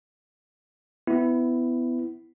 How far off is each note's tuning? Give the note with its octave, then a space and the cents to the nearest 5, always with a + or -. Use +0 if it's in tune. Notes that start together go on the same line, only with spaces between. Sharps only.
B3 +25 E4 +5